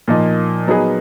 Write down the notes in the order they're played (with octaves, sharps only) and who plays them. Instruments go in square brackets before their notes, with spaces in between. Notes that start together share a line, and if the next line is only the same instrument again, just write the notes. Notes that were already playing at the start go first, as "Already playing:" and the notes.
[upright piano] A#2 F3 A#3 D#4
F#3 B3 D#4 G#4 B4